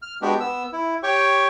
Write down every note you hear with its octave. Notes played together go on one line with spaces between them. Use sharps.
F6
G#3 B3 D4 F#4 G4
B3 E6
E4
G4 C#5 G5 C#6